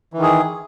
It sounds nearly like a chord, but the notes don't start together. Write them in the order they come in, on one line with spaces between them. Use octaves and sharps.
E3 D#3 G#4